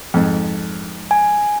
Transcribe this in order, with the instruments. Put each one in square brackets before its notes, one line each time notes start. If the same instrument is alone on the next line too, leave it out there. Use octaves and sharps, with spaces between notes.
[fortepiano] F2 G#2
[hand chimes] G#5